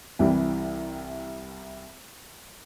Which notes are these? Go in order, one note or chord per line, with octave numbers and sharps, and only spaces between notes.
C2 C3 E3 G3